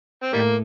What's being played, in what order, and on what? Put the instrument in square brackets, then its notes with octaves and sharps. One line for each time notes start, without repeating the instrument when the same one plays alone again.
[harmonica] C4
[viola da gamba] A2 [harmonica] D#3 G3 A#3